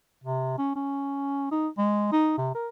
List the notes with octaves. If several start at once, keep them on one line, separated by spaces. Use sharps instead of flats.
C3
C#4
C#4
D#4
G#3
D#4
C3
A#4